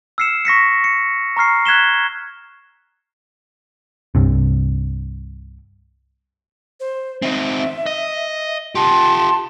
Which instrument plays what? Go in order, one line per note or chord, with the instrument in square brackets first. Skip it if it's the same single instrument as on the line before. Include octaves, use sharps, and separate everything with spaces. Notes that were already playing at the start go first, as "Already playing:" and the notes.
[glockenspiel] E6 F6 C7 C#7 E7
C#6 A#6 B6 C#7
C#7
A#5 C#6 F6 C7
F#6 G#6 B6 E7 G7
[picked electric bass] C2 G2 C3
[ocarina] C5
[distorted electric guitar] C4 D#4 [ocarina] E5
[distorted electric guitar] D#5
[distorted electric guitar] F4 G4 [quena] A5 [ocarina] C6